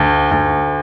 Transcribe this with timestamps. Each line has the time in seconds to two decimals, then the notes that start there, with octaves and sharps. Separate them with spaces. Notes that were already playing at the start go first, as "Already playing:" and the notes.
Already playing: D2
0.31 D2